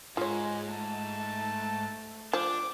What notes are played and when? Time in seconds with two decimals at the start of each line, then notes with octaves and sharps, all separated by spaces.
0.17 G#2 G#3 F4 C#5
0.70 A3 A5
2.33 F3 D4 D6